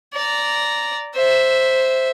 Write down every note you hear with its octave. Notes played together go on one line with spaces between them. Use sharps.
D5 A#5
C5 E5